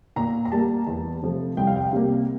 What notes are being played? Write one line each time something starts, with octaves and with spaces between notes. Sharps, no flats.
A#2 A#5
A#5
G3 A#3 A5
E2 A5
C3 F3 A3
C2 G5
F5
G5
C3 G3 A#3